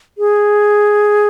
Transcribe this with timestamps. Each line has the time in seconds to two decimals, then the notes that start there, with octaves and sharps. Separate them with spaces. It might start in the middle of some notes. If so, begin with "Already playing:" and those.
0.18 G#4